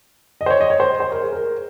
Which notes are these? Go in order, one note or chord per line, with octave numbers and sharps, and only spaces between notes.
D#5
C5
C#5
D#5
C#5
C5
C5
A#4
G#4
A#4